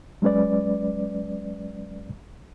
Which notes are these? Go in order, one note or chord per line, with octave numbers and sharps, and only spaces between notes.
F#3 G#3 C#4 B4 D5